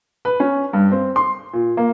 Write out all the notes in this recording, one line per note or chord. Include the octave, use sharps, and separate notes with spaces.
B4
C#4
G2
C4
C6
A#2
A#3